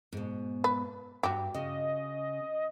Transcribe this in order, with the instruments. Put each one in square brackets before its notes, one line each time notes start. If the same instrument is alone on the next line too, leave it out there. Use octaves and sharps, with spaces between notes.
[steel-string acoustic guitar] G#2 B2
[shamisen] B4
[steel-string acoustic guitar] G2 [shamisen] F#4 G4
[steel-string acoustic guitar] C#3 [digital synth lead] D#5